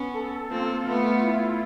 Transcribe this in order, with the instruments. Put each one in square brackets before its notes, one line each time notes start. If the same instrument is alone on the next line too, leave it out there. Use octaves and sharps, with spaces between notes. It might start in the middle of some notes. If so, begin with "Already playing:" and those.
Already playing: [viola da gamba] B3 C#4
[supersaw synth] A4
[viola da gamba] A#3 C4 [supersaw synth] F4
[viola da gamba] A3 B3 [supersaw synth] F4
[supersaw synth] E4